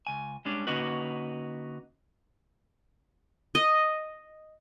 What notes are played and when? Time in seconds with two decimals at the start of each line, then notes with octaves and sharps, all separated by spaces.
0.07 C#2 G#5
0.45 G3 G#3 C#4 D4
0.67 D3 A#3 C#4 D#4 F#4 B4
3.55 D#5